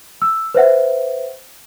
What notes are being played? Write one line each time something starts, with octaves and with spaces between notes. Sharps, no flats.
E6
B4 C5 E5 F#5